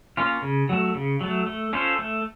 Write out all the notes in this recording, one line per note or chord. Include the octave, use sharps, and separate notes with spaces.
A#3 C#4 F4
C#3
F#3 A3
C#3
F#3 A3
A3
C#4 F4 A4 C5
A3